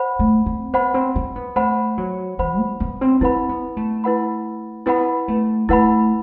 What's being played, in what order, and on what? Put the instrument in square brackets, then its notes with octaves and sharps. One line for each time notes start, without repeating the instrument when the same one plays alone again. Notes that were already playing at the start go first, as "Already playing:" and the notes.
Already playing: [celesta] C5 F#5 B5
[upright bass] A3
C4
[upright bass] B3 [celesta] C5 F#5 B5
[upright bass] C4
C4
B3
[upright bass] A3 [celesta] C5 F#5 B5
[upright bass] F#3
[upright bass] E3 [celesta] C5 F#5 B5
[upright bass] B3
B3
C4
[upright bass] C4 [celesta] E4 B4 F#5 B5
[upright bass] B3
A3
[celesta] E4 B4 F#5 B5
[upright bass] B3 [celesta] E4 B4 F#5 B5
[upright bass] A3
[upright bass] A3 [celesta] E4 B4 F#5 B5